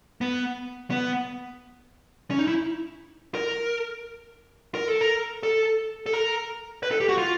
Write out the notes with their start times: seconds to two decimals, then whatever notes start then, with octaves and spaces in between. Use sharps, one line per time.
0.21 B3
0.90 B3
2.31 C#4
2.39 D#4
2.47 E4
3.35 A#4
4.75 A#4
4.88 A4
5.01 A#4
5.43 A4
6.06 A4
6.14 A#4
6.83 B4
6.91 A4
7.00 G4
7.09 F#4
7.18 F4